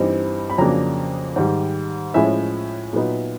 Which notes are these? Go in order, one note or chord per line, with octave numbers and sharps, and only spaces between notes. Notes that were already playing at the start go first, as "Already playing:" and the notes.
Already playing: G2 E3 G3 C4 D#4
B5
F2 C#3 F#3 A#3 D4 A#5
G#2 D#3 G3
A2 F3 G#3 C#4 E4 E5
A#2 F#3 B3 D#4